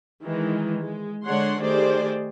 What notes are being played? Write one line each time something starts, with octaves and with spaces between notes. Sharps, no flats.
D#3 E3 G#3
G#3
D3 G#3 D4 C#5 F#5 C6
D#3 A3 G4 G#4 C5 D5